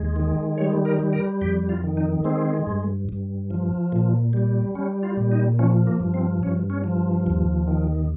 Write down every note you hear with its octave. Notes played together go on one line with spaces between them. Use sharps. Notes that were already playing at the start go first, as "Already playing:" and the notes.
Already playing: D#2 G#3
D#3
G3 C#5
A#4
G3
A#4
F2 G4
F4
D#3
D#4
G#3 C4
G2
G2
F3
A#2
G3
G3 C#4
F4
A#2
D#4
F3 C#4
A#3
G2
C4
G2 C#4
C#4
F3
D#2
D#3